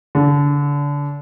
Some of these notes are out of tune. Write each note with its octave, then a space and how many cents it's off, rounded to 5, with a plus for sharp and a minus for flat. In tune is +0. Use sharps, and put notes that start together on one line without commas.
D3 -30